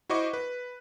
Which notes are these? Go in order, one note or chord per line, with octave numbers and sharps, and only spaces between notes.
E4 F#4 C5 D#5 C#6 D6
B4